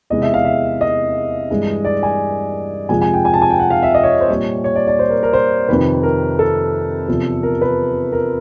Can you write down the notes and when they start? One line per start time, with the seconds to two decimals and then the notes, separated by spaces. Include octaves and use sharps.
0.10 E2 C3 E3 G#3 D#5
0.22 E5
0.34 F5
0.45 E5
0.81 D#5
1.50 G2 E3 G#3
1.85 D5
2.03 G#5
2.89 F2 C3 F3 G#3 G#5
3.02 G#5
3.14 G5
3.25 G#5
3.34 A5
3.42 G#5
3.50 G5
3.59 F#5
3.70 F5
3.83 E5
3.94 D#5
4.03 C#5
4.21 C5
4.29 A#2 G3 C#5
4.64 C#5
4.75 D5
4.87 D5
4.99 C5
5.10 A#4
5.23 A#4
5.33 C5
5.69 F2 C3 D#3 B4
6.03 A#4
6.39 A4
7.08 E2 C3 F3
7.43 A#4
7.61 B4
8.13 A#4